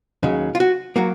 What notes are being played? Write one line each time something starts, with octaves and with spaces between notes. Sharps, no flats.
D#2 C#3 F#3
F4
F#4
F#3 A#3 F#4